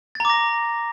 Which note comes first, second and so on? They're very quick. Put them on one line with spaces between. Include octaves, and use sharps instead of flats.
A6 A#5 D6 A#6